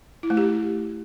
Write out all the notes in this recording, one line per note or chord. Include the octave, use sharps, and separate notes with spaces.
E4
A3
G4